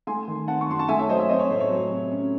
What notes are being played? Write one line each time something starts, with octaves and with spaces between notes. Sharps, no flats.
A3 G#5 C6
D#3
C4 F#5 A5
C#6
F#2 C6
A5
A3 E5 G#5
C#5 E5
F#3 C5 D#5
C#5 E5
C4 C5 D#5
C#5
A2 C5
C#5
F#3
C3
C#4